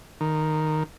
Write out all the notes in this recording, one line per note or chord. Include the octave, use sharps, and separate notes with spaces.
D#3